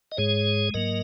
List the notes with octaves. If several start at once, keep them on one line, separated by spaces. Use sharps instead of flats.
D#5
G#2 G#3 G#4 C#5
G#2 F#3 A#3 A#4 D#5